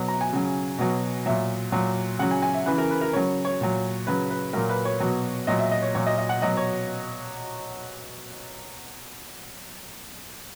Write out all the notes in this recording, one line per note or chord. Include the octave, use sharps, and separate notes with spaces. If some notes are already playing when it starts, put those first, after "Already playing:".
Already playing: B2 F#3
A#5
G#5
C#3 F#3
B2 F#3
A#2 F#3 E5
A#2 F#3
C#3 F#3 F#5
G#5
G#5
E5
C#3 E3 B4
A#4
B4
A#4
C#3 F#3 C#5
C#5
A#2 F#3
C#3 F#3 B4
B4
A#2 F#3 A#4
B4
C#5
B2 F#3
A#2 F#3 D#5
E5
D#5
C#5
A#2 F#3 C#5
D#5
D#5
F#5
B2 F#3 D#5
C#5